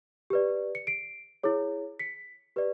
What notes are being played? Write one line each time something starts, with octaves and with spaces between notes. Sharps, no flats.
G4 B4 D5
C#7
C7 D7
E4 G#4 C#5
B6 C#7
G4 B4 D5